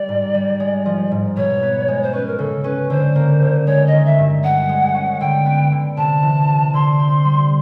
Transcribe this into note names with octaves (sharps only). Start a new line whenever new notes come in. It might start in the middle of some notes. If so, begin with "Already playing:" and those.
Already playing: G3 D5
G#2
G3
G#3
F3
G#2
B2 C#5
B3
G#3
C5
C#4 B4
A#4
C#3 A4
C#4 B4
D3 C5
A#3
D3
G#3 C#5
D#5
D#3
E5
G2
G#3 F#5
G#3
C#4
D3 G5
B3
D3
C3 A5
E3
C3
D3 C6
C4
G3